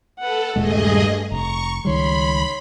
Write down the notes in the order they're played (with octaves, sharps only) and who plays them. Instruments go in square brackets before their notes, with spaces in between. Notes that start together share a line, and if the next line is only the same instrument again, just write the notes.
[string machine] A4 [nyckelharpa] B4 F#5
[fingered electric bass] D#1 A#2 G#3 [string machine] G2 G#4 D#5 [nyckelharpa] A3
[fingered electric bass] F1 [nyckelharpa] A#5 [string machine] C#6
[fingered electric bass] C#2 D#3 G3 [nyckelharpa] C#5 C6 [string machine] B5